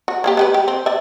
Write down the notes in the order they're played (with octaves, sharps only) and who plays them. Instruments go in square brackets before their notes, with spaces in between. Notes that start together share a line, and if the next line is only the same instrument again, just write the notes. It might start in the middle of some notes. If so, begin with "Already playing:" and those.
[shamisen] F#4
A#3 E4 G4
G#3 G4 B4
G4
C4
D5 E5